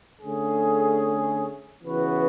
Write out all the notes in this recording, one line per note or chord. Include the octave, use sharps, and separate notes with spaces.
D3 A3 C#4 G#4
C#3 E3 B3 F#4 B4